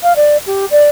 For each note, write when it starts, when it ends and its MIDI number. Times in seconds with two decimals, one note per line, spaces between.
0.03 0.13 77
0.16 0.37 74
0.46 0.65 67
0.70 0.90 74